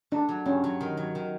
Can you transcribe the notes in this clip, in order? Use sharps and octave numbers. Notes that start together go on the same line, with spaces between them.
A3 D4
F#3
G2 C#4
F#3
D#3
F#3
D#3